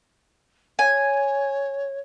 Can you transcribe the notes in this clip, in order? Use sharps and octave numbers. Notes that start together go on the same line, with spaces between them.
C#5 G#5